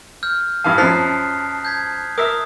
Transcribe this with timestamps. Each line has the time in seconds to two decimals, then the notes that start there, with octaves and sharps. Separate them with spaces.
0.23 F6 G6
0.64 G2 E3 F5 A5 D#6
0.78 F#2 F3 F#6 B6 C7
1.65 G6 G#6 B6
2.18 A#4 E5 D#6